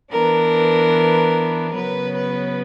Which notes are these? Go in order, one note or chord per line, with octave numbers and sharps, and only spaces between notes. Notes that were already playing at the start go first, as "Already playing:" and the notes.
E3 B3 D4 A#4
C#3 F#3 B3 B4
B4